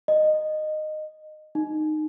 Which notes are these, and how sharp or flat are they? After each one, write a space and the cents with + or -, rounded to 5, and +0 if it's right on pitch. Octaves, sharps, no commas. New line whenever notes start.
D#5 -15
D#4 -15